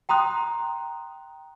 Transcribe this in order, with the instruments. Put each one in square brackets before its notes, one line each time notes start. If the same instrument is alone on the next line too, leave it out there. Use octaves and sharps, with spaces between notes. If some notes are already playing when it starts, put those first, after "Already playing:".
[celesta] G5 A#5 C6 D#6 F#6